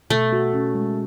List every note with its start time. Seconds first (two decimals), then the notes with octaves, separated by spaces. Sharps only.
0.10 B2 A3
0.33 F#4
0.54 C#4
0.75 G#3